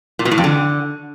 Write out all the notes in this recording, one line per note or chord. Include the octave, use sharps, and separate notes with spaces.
A#2
B2
A2
F2
D3